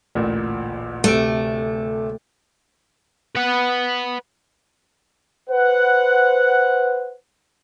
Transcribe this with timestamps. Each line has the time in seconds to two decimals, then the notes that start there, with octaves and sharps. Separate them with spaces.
0.15 A1 D2 A#2
1.04 D1 C3 A3 D7
3.35 B4 F#5
5.50 B4 C5 F#5